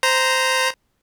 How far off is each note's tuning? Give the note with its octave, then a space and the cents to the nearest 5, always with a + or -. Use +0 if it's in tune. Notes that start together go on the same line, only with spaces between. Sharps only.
C5 -10 A#5 +0